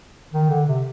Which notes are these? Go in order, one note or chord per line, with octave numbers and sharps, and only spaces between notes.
D#3
D3
C3